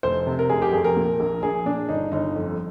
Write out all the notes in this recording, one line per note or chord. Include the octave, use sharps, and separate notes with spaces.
F1 C5
C3
A#4
F1 G#4
G4
F2 G#4
A#4
A#2
A#1
A#1 G#4
A#2 D4
G1 D#4
G1 D#4
F2